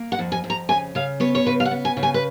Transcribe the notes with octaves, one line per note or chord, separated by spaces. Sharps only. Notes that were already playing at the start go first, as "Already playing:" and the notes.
Already playing: A#3
F#5
F2
G#5
F2
A#5
C#3 G#5
C#3 F5
B3 C#5
C#5
C#3 B4
F5
F#5
B3
G#5
C#3
G#5
B4